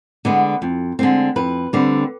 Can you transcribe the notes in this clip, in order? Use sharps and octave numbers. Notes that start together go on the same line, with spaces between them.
D3 G#3 B3
F2
D3 G#3 C4
F2 B4
D3 G3 C4